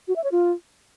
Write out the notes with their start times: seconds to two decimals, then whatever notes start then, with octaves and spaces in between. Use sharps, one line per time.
0.08 F#4
0.16 E5
0.24 C#5
0.32 F4